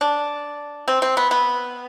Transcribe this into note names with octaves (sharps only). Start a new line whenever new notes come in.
D4
C4
C4
B3
B3